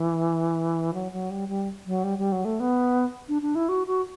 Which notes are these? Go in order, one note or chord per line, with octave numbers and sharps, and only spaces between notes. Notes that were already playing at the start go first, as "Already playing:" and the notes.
Already playing: E3
F#3
F#3
G3
G3
F#3
G3
G3
F#3
A3
B3
D4
D4
E4
F#4
F#4